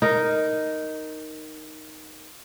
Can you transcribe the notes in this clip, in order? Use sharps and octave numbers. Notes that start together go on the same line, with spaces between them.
D#4 A#4